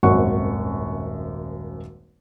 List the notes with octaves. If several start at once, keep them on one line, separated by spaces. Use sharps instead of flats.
D#1 G#1 F#2 F#5 C#6